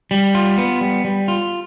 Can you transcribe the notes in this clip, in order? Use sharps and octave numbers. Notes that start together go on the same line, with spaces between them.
G3
F4
B3
G3
G3
F4